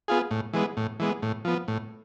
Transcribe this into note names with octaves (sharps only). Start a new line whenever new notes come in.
B3 F4 G#4
A2
E3 G#3 B3
A2
E3 G#3 B3
A2
F3 B3
A2